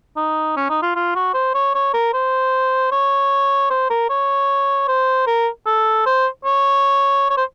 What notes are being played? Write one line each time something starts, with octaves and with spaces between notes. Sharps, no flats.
D#4
C#4
D#4
F4
F4
F#4
C5
C#5
C#5
A#4
C5
C#5
C5
A#4
C#5
C5
A#4
A4
C5
C#5
C#5
C5